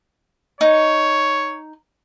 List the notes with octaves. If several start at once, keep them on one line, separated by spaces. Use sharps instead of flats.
D#4 C#5